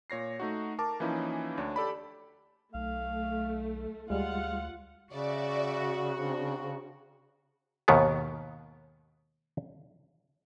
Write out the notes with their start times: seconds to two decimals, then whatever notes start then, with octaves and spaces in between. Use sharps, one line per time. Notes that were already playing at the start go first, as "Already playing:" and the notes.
0.10 A#2 C#5 A#6 C7
0.40 A3 D#4 F#4
0.78 A#4 A5 D6
1.00 E3 F3 A#3 C#4 D#4 E4
1.58 D2 D4 C#5
1.76 G4 A4 D5 B5
2.74 B1 A3 F5
4.10 D2 G3 G#3 F4 F5 F#5
5.12 C#3 F#4 D5 E5
6.17 C4 D4
7.88 D#2 G#2 B2 D#3 B3